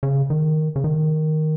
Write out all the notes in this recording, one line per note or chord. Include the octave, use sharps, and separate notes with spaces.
C#3
D#3
C#3
D#3